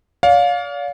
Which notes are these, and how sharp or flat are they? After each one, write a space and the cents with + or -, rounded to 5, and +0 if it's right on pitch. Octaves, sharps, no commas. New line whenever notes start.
D5 -45 F5 +20